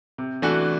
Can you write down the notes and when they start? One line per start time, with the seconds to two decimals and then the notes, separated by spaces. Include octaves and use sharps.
0.18 C3
0.42 E3 A3 D4 F#4